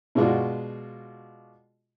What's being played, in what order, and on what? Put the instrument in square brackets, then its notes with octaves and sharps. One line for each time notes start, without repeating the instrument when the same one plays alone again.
[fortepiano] B2 G#3 D4 F4 F#4